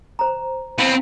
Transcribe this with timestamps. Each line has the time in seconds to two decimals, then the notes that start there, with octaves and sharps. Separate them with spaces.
0.19 C5 A#5
0.79 B3 C4 E4 F5